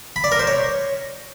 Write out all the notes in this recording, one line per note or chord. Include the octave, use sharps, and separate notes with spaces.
B5
D5
A#4
C5
C#5